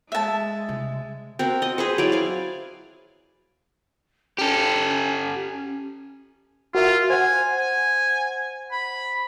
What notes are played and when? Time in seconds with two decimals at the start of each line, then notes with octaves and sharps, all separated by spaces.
0.12 G#3 E5 A5
0.68 C3 G3
1.39 C4 F#4 A#4
1.62 D#5
1.78 G#4 B4 C5
1.98 F#3 E4 D5
2.12 F5 G#5
4.38 C#4 G4 A4
6.75 F4 F#4 A#4 E5
7.10 C5 F#5 G#5
7.56 G#5
8.72 B5